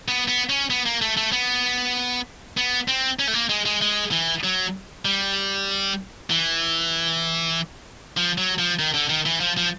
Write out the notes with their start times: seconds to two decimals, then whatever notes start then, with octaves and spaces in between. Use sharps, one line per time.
0.08 B3
0.28 B3
0.49 C#4
0.70 B3
0.86 A#3
1.02 A3
1.17 A3
1.32 B3
2.57 B3
2.88 C4
3.19 C#4
3.28 A3
3.34 A#3
3.49 G#3
3.65 G#3
3.82 G#3
4.11 E3
4.44 F#3
5.05 G3
6.30 E3
8.17 F3
8.38 F#3
8.59 F3
8.79 D#3
8.94 D3
9.09 D#3
9.26 E3
9.40 F3
9.57 F3